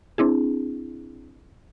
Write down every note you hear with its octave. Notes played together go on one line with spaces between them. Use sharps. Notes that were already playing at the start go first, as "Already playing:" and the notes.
C4 D4 E4 G#4